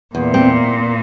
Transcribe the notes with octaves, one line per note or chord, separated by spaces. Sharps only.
E2 A#2
C4